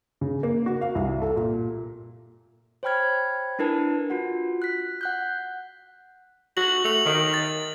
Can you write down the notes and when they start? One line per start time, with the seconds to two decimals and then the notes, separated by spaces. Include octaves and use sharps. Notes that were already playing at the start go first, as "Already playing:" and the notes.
0.21 C#3
0.43 A#3
0.66 F#4
0.81 F5
0.95 C2
1.22 A4
1.36 A#2
2.83 C5 C#5 G5 B5 F6 G#6
3.59 D4 E4 A#4 B4 A5
4.10 F4 F#4 F#5
4.62 F#6 B6
5.01 F#5 F#6 G6
6.57 F#4 F#7
6.84 A3 F7 F#7
7.06 D#3
7.34 A6